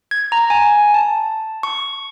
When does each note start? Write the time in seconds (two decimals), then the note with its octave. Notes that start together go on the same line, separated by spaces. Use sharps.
0.11 G#6
0.32 A#5
0.50 G#5
0.94 A5
1.63 C#6